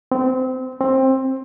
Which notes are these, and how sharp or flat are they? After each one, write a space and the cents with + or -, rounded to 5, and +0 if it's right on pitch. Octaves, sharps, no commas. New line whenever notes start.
C4 -20
C4 +20